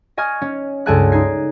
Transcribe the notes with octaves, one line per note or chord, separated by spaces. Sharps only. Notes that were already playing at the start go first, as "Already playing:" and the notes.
D#5 G#5 C#6 F6 G#6
C#4
C#2 G2 A4 G#5 A5 F#6
D#4 G#6 C7